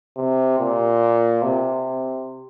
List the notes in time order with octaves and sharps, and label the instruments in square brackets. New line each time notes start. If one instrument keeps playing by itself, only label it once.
[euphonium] C3
A#2
C3